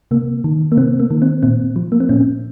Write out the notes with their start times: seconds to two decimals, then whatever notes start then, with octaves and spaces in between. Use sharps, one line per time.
0.11 C3 A#3
0.44 D#3
0.72 A#3
0.77 C3 C4
1.00 A#3
1.11 D#3
1.22 C4
1.43 A#2 C4
1.76 F3
1.92 A#3
2.00 C4
2.09 A#2 C#4